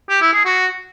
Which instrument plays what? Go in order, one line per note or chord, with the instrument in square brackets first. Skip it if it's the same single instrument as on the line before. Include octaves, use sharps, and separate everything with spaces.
[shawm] G4
E4
G#4
F#4